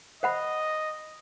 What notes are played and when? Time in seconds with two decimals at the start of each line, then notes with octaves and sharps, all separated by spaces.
0.23 C5 D#5 F#5 B5